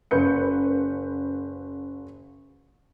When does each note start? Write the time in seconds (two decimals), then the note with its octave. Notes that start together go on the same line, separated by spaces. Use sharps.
0.11 F#1 B4 G6 C#7